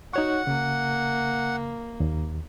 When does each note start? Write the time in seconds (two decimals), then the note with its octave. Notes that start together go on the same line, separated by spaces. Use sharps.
0.13 D#4 F#4 C#5 F#5 C#6
0.47 C#3 A#3
2.00 D#2